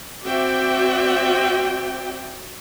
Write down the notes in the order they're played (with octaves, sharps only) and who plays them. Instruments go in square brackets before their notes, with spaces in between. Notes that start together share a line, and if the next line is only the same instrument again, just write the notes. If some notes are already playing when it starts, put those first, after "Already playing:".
[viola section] C4 F#4 D5 E5 G5